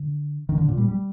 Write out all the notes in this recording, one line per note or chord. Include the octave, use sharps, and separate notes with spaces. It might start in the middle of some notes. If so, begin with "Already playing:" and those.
Already playing: D3
D#3
D3
A#2
G3
G3